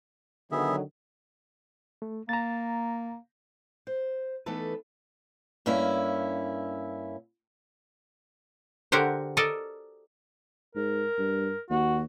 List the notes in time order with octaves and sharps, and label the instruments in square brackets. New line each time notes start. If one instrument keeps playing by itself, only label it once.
[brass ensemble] D3 D#3 F#3 [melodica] B3 G#4 E5
[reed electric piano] A3
[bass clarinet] A#3 [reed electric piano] A#5 A6
[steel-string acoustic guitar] C5
E3 A3 B3 D#4 A4 B4
G2 A#3 C#4 E4
[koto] D3 F#4 G4 A#4 C5
A4 A#4 D5 D#5
[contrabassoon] G#2 [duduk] A#4
[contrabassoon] G2
[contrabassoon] D#2 [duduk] F#4